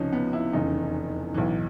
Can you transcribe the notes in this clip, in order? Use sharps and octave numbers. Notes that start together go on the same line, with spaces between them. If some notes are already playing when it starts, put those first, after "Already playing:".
Already playing: C#2 C3 F3 C#4 D#4
B3
E4
F1 E2 C#3 D#4
B1 A2 E3